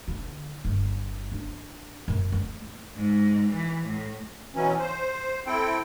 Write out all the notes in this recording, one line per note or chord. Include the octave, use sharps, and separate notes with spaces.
D3
G1
D4
F#2
A3
G#2
E3
A2
B2 E3 F#3 C#4
C5
C4 E4 A4 G5